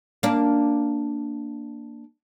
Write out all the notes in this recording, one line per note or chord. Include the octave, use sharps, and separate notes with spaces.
A#3 D4